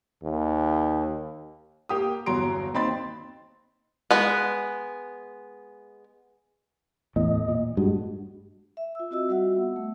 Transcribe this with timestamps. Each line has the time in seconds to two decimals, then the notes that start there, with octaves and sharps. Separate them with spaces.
0.23 D#2
1.89 A#3 G4 D#6
2.26 G1 E2 F#3 A#5 C6 D7
2.74 D#2 C4 D#4 B5 C6 A6
4.11 G#3 B3
7.16 E2 A2 D#5
7.48 A#2
7.77 G2 G#3 F#4
8.77 E5
8.95 F4 E6
9.11 C4 F4 F#4 D#5 E6
9.29 G3 F#4 E5 F#5 E6
9.56 B3
9.76 A3